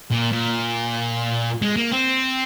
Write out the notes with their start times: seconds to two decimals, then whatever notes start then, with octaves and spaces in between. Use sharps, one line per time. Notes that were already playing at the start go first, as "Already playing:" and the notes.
0.11 A#2
0.33 A#2
1.62 G#3
1.76 A#3
1.92 C4